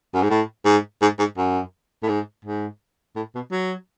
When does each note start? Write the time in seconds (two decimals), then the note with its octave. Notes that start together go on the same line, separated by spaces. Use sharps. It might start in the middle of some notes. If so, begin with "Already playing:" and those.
0.14 F#2
0.23 G#2
0.30 A2
0.65 G#2
1.02 G#2
1.19 G#2
1.37 F#2
2.03 A2
2.08 G#2
2.45 G#2
3.16 A2
3.35 B2
3.51 F#3